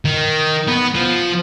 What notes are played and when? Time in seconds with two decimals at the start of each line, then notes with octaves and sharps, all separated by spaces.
0.05 D#3
0.68 B3
0.95 F3